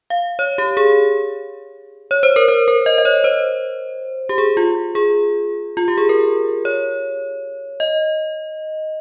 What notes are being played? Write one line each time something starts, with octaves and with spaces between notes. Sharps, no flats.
F5
C#5
G4
G#4
C#5
C5
A#4
C5
A#4
D#5
D#5
C#5
C5
G4
G#4
F4
G#4
F4
G4
G#4
A#4
C#5
D#5